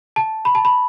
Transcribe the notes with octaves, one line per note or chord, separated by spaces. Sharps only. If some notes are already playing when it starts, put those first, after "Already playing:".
A5
B5
A5
B5